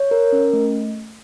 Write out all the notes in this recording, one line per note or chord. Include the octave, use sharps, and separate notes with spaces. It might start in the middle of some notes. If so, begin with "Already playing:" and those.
Already playing: C#5
A#4
C#4
A3